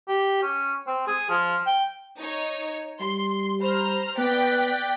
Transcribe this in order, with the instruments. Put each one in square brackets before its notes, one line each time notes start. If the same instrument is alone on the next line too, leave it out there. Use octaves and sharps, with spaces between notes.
[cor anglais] G4
C#4
C4
G#4
F3
G5
[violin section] D#4 C#5
[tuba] G3 [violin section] C6
[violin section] C5 A#5 F6 [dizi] B5
[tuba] B3 [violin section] D5 G5 B6 [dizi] F#6